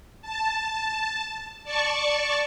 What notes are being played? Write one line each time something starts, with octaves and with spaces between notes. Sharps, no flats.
A5
D5 A5 C#6